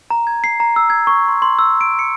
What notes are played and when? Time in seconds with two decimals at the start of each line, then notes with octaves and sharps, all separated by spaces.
0.10 A#5
0.27 G#6
0.44 C7
0.60 A#5
0.76 E6
0.90 G#6
1.07 C#6
1.28 C6
1.42 C6
1.59 E6
1.81 D7
1.99 C#7